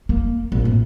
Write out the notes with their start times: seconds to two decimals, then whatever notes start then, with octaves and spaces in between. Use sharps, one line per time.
0.09 A#3
0.52 A#1
0.65 A2